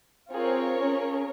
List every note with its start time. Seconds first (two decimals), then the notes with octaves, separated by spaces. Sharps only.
0.32 C4 F4 G#4 A#4 C#5
0.78 C#4 G#4